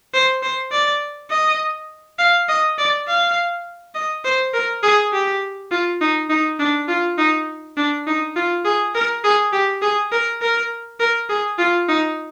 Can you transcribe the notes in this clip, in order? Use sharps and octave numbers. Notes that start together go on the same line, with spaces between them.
C5
C5
D5
D#5
F5
D#5
D5
F5
D#5
C5
A#4
G#4
G4
F4
D#4
D#4
D4
F4
D#4
D4
D#4
F4
G#4
A#4
G#4
G4
G#4
A#4
A#4
A#4
G#4
F4
D#4